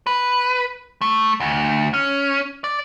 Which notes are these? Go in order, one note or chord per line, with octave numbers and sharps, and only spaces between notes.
B4
A3
D2
C#4
D5